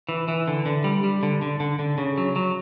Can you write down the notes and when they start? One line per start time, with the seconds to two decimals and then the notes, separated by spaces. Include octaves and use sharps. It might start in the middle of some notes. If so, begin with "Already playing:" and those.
0.09 E3
0.28 E3
0.48 D3
0.66 D3
0.84 G3
1.04 G3
1.23 D3
1.42 D3
1.60 D3
1.79 D3
1.98 C#3
2.18 F#3
2.36 F#3